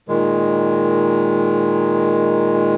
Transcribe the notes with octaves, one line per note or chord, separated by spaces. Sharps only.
A#2 D#3 G#3